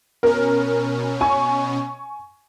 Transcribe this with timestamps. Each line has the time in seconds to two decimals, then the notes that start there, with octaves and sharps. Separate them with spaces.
0.23 B2 C#4 A#4
1.21 G#5 C#6